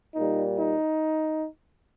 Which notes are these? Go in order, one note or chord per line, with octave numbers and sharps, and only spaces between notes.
A#2 G3 D#4
D#4